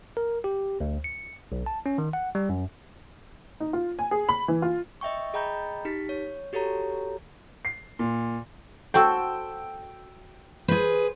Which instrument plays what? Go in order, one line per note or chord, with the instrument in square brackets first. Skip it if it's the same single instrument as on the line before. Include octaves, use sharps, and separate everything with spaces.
[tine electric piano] A#4
G4
D2
C#7
B1
A5
C#4
D#3
F#5
G3
F#2
[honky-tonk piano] D#4
F4
G#5
G#4
B5
E3
F4
[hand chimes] D#5 E5 G5 C#6
G#4 D#5 G5 A#5 B5 G6
D#4 G4 B6
C#5
F#4 G4 A4 C#5 A#5
[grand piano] C7
A#2
[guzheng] F#4 A4 C5 [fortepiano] G5 E6
[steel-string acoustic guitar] G#4 B4 [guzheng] C5